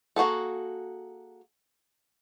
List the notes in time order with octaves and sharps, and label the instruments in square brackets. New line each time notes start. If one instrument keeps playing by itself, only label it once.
[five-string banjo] A#3 F#4 G#4 A4